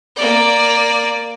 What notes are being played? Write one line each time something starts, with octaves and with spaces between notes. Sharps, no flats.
A#3 D5